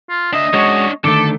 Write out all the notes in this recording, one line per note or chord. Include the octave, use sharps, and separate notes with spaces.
F4
D4 D#5 E5
G#3 C#4 D4 F#4 C#5
D3 D#3 A3 A4 D6